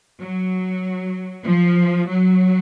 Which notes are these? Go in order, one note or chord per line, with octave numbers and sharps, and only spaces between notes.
F#3
F3
F#3